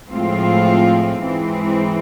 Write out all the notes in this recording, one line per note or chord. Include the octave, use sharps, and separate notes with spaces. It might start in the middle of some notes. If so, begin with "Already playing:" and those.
A2 F3 G#3 C4 F4
G#2 E3 G#3 C4